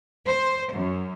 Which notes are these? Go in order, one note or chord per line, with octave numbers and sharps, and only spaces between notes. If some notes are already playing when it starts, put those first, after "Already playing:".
C5
F#2